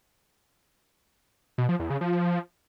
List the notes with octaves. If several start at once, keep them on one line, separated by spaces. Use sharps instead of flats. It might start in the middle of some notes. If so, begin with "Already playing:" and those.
B2
F3
E2
C#3
F3